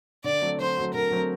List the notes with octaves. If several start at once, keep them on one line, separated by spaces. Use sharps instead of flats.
D3 D5
F#3 A3 C4 F#4
D3 C5
F#3 A3 C4 F#4
D3 A#4
F#3 A3 C4 F#4